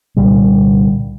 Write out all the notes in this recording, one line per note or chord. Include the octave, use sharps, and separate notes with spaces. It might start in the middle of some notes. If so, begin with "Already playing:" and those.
C2 A#2 D3 G3